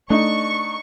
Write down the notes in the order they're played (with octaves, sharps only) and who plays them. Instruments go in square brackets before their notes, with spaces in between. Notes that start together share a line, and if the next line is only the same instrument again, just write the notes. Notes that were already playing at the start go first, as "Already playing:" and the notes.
[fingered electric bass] A3 [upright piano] D4 D#4 [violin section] C#6